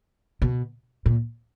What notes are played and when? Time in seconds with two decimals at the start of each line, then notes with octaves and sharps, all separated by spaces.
0.42 B2
1.06 A#2